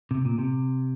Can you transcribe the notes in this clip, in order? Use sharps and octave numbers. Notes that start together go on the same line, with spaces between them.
C3
A#2
C3